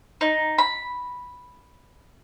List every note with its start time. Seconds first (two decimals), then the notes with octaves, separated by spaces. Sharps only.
0.21 D#4
0.58 B5